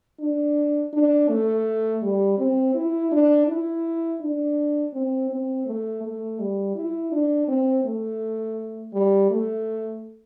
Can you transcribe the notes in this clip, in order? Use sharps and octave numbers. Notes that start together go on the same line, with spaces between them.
D4
D4
A3
G3
C4
E4
D4
E4
D4
C4
C4
A3
A3
G3
E4
D4
C4
A3
G3
A3